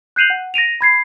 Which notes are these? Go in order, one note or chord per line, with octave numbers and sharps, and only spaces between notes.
F#6 G6 C7 D#7 F7 F#7
F#5
A#6 D7 D#7 F7
B5 G#6 C7